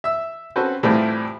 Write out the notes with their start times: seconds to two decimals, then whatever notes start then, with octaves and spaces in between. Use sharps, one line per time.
0.04 E5 E6
0.56 C4 C#4 F#4 A4 B4 C5
0.83 A2 E3 G3 A3 C4 F4